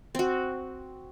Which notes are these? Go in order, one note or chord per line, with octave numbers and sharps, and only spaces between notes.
C4 F#4